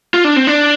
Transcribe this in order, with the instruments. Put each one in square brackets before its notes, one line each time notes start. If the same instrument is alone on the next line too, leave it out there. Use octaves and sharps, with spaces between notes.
[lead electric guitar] F4
D4
C4
D4